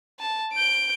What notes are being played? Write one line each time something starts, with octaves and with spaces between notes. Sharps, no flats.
A5
G6 D7